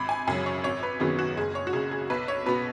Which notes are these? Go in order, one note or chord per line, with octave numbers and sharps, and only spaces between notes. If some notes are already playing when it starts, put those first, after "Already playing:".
Already playing: G#1 B5
G#5
F#2 C#3 F#3 G#5
C#5
G#1 C#5
B4
F#2 D#3 F#3 B3 G#4
F#4
F#1 G#4
C#5
F#4
F#2 C#3 G#4
G#4
B1 B4
C#5
B2 B3 B4